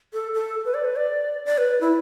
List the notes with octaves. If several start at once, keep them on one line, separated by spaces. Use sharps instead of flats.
A4
A4
B4
D5
B4
D5
D5
B4
E4